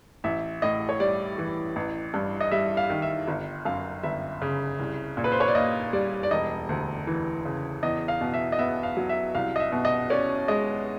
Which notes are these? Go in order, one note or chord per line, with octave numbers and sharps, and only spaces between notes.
A1 E5
A2 D#5
C#5
G3 D5
E3
A1
G2
D#5
G3 E5
F5
D#3
E5
G1
F#2 F5
G1 E5
C#3
C2
A#2
B4
C5
C#5
D5
A#3 D#5
G3 D5
D5
E1 D#5
D2
E3
C#3
E2 D#5
F5
B2
E5
D#5
B3 E5
F5
F#3
E5
C2 F5
D#5
E5
B2
D#5
C#4 D5
G#3 D#5